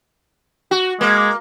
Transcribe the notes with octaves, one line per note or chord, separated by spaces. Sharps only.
F#4
G#3 A#3